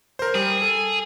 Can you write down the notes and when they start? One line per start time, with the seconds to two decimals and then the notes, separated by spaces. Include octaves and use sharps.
0.19 A#4 C5
0.35 G3 G#4
0.62 A4